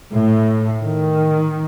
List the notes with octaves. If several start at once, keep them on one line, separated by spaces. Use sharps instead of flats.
A2
D#3